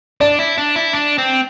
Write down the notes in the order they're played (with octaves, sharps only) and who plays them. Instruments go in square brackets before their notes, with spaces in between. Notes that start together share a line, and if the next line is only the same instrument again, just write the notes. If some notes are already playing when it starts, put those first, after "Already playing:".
[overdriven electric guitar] D4 [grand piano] D5
[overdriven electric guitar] E4
D4
E4
D4
C4